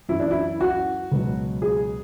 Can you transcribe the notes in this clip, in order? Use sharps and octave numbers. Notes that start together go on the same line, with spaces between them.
F#2 E3 E4
D4
E4
F#4
C#2 B2 F#3
G#4